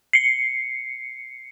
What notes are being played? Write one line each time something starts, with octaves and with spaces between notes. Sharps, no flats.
C7 C#7